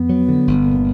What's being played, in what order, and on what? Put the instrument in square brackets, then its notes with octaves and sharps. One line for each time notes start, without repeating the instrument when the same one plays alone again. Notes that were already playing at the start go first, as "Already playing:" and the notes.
Already playing: [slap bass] F2 [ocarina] B3
[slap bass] F#3
D3
G1
A#2